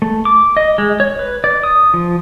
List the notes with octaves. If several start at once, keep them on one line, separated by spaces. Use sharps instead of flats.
A3
D6
D#5
G#3
C#5
B4
D5
D#6
F3